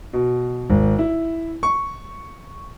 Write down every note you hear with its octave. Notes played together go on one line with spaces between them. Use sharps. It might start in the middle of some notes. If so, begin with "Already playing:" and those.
B2
G#1
E4
C#6